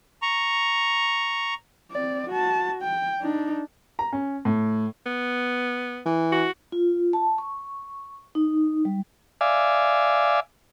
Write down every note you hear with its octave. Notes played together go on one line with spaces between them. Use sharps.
A#5 C#6
C4 D5
F#4 A5
G5
D4 D#4
A#5
C#4
A2
B3
E3
F#4
F4
A5
C#6
D#4
G3
D5 E5 F5 G#5